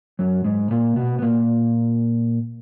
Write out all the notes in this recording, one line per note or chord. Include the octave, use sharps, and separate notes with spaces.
F#2 F#3
G#2 G#3
A#2 A#3
B2 B3
B3
A#2 A#3